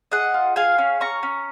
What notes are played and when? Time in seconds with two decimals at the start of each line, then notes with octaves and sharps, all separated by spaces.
0.12 G#4 D#5 F#5
0.34 F4
0.56 G#4 F5 G#5
0.78 C#4
1.00 C#4 A#5 C#6
1.23 C#4